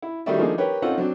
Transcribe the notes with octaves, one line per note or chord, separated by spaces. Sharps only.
E4
D#3 G3 A3 F#4 D5 E5
F3 A3 A#3 D4 D#4 G#4
G4 A#4 B4 C#5 G5
C4 C#4 D#4 F4 A4 F#5
F#3 C4 D4